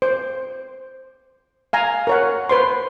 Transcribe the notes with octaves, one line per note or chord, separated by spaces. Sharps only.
C5
F5 G#5 A#5
A#4 C#5 F#5
B4 C5 C6